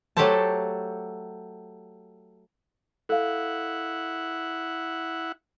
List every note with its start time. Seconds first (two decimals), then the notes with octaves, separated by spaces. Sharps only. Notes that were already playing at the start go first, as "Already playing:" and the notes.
0.17 F#3 A3 G4 A4 C5 A5
3.09 E4 A4 F5 F#5